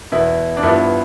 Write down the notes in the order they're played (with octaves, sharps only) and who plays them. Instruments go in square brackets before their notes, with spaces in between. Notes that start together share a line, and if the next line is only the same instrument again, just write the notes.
[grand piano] E2 B2 B3 E4
D4
G2 F3 B3 E4